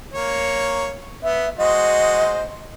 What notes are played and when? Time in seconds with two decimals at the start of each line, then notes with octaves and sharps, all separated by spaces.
0.13 A#3 C#5
1.23 B3 E5
1.58 G#3 F#4 C5 D#5